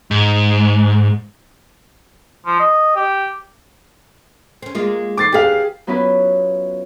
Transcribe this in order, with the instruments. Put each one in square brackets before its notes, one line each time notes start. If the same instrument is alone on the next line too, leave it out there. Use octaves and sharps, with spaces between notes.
[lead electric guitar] G#2
[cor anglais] F3
D#5
G4
[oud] C4 C#4
G#3 A#3 F4
[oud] E2 C4 [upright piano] D6 A6 C7
[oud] D#2 B3 [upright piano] G4 G#4 F5
[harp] F#3 B3 C#4 E4 F4 B4